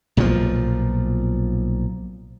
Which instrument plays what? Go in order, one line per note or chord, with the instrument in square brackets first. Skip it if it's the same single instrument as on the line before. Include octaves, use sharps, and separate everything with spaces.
[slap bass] B1 A#2 D3 F3